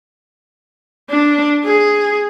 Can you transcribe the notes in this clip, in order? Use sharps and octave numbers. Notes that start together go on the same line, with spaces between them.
D4
G#4